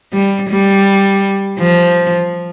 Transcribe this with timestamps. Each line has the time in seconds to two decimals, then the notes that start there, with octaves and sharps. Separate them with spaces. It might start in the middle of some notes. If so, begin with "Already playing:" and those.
0.13 G3
0.49 G3
1.59 F3